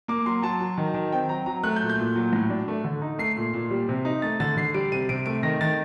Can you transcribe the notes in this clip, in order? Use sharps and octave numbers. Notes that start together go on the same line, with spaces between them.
A#3 D6
F#3 C6
F#3 A5
F#3
D#3
D#3
C4 G5
F#3 A#5
F#3 A#5
A3 F#6
G6
A#2
G6
A#2
F#3
A2
D4
A3
D3
D#4
A3 C7
A#2
A#2
G3
C3
D#4
A3 A6
D3 A6
D3 C7
G3 D7
C3 D#7
C3 D7
A3 D7
D#3 A#6
D#3 A6